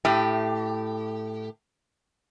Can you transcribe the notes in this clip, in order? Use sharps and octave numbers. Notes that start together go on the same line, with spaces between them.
A2 G4